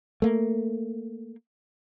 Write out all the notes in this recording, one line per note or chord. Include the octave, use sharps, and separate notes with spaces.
A3 A#3